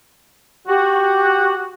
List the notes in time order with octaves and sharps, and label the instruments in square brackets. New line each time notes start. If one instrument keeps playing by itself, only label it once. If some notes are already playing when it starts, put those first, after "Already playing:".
[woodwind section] F#4 [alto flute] G4